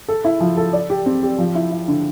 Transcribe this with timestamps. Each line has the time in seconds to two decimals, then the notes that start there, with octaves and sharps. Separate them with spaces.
0.08 A4
0.25 E4
0.41 F3
0.57 A4
0.73 D5
0.90 G4
1.06 C4
1.23 G4
1.38 F3
1.55 E4
1.71 E4
1.88 D3